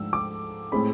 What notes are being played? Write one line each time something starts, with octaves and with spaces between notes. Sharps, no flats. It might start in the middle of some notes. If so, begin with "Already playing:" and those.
Already playing: G#2 F3 A3 D4 E6
D6
A2 G#3 C4 B5